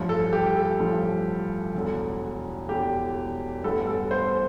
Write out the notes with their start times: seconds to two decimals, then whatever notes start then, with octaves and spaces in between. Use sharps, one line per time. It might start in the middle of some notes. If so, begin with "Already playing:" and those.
Already playing: A1 G2 F3
0.09 A4
0.33 G4
0.56 A4
0.80 A1 G2 F3
1.75 E1 E2 D3
2.69 E1 E2 D3 G4
3.63 A1 G2 D3 G3 B3 A4
3.87 A4
4.11 C5